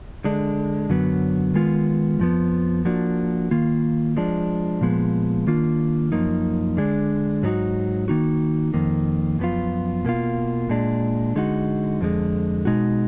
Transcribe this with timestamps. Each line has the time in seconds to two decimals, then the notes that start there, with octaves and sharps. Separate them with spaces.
0.24 D3 G#3 D4
0.90 F#2 D3 F#3 B3
1.54 D#3 G#3 B3 F4
2.20 F2 F3 B3
2.85 F3 A#3 D4 F#4
3.51 D#3 A#3 F4
4.17 F3 G#3 D4
4.81 A#2 F3 G#3 B3
5.47 D#3 A#3 D4 F4
6.12 F#2 F3 A#3 D#4
6.77 D3 G#3 D4
7.43 G#2 F#3 B3 D#4 F#4
8.08 D#3 A#3 D#4 F#4
8.74 F2 D#3 A#3
9.39 F#2 F3 B3 F4
10.05 B2 A#3 F4
10.69 A#2 G#3 D4
11.35 D3 G#3 D#4 F#4
12.01 F2 D3 G#3
12.65 B2 G#3 D#4 F#4